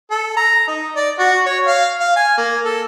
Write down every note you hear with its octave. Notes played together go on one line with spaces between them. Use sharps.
A4
A#5
D#4
D5
F#4
C#5
F5
F5
G#5
A#3
A4